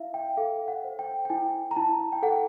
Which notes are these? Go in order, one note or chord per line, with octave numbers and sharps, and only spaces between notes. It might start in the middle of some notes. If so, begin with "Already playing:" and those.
Already playing: E4 E5 F5
G5
A4 F5
F#5
C5
G5
G5
E4 G#5
A#5
E4 A5
G5
A4 F#5